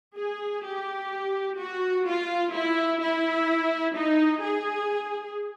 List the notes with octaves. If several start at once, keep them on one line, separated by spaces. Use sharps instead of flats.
G#4
G4
F#4
F4
E4
E4
D#4
G#4